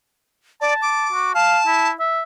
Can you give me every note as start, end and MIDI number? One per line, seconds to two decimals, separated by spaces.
0.61 0.74 74
0.61 1.07 81
0.82 1.32 86
1.12 1.33 66
1.35 1.59 77
1.35 1.89 81
1.67 1.93 64
2.00 2.23 76